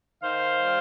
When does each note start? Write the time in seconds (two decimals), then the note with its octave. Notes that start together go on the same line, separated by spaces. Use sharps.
0.22 D#3 C5 F5
0.59 G3